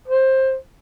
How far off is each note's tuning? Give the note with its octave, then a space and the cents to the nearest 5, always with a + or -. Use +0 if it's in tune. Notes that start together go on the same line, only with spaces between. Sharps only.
C5 +15